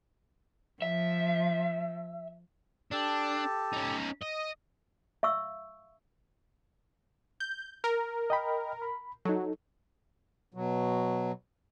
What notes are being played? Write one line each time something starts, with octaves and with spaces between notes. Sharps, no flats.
F3 E5
D4 G4 A4 A5
C#4 D#4
D#5
E5 F5 C#6 E6
G6
A#4
D#5 G5 B5
B5
F#3 D#4 A4
B2 F#3